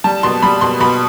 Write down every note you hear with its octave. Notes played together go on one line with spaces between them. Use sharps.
G3 A5
B2 C6
G3 B5
B2 C6
B2 B5